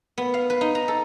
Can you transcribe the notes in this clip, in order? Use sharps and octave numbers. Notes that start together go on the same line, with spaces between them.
B3
F5
B4
D#4
A#5
A4